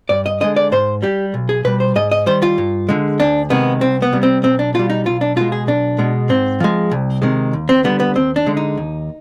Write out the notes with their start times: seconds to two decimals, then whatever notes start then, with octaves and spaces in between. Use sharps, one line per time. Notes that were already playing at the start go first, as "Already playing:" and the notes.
0.09 G2 D5
0.26 D#5
0.41 D3 G#3 D#5
0.56 D5
0.72 G#2 C5
1.02 G3 G4
1.34 B1
1.49 G#4
1.64 B2 G3 B4
1.80 C5
1.96 G#2 D#5
2.11 D#5
2.26 D#3 G3 C5
2.42 F4
2.58 G2
2.89 D3 G#3
3.20 D2 D4
3.50 C3 D#3 G#3 B3
3.81 C2 C4
4.02 B3
4.12 C3 G3
4.23 C4
4.43 B1 C4
4.59 D4
4.74 B2 G3 F4
4.90 D#4
5.06 B1 F4
5.21 D4
5.36 B2 G#3 F4
5.52 G#4
5.67 B1 D4
5.98 B2 G#3
6.29 G#2 C4
6.60 F3 G#3
6.91 C2
7.22 C3 D#3 G#3
7.53 D#2
7.69 C4
7.84 D3 G3 B3
8.00 B3
8.15 D#2 C4
8.36 D4
8.46 D3 G#3
8.57 D#4
8.77 D#2